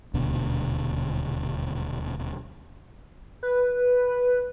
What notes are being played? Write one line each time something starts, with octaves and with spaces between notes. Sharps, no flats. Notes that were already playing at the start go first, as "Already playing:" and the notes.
D#1 D2 B2 D3
B4